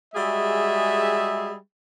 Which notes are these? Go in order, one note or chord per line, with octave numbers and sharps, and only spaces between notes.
G3 G#3 F#4 G#4 E5